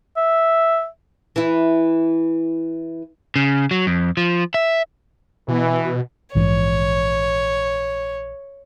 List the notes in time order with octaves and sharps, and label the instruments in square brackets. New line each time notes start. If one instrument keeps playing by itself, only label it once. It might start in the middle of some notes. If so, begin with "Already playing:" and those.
[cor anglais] E5
[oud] E3 E4
[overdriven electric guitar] C#3
F#3
F2
F3
E5
[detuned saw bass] B2 [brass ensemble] E3
[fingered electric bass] A#1 G#2 E3 [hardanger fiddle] C#5